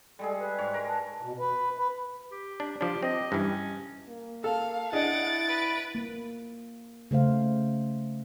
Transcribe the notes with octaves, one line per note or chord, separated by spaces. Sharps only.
G3 G#3 G#4 A4
B4
G#2 C#5
A#4
A5
B2
B4
B4
G4
D4
F3 D4 G4
C4 D#5
G2 E3 C#4
A#3
A4 F5
D4 E4 G#4 D#5 F#5 A6 D7
B4
A#3
C#3 A3 C5 F5